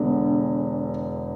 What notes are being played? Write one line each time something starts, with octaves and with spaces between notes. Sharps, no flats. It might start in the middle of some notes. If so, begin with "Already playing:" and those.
Already playing: E1 E2 D3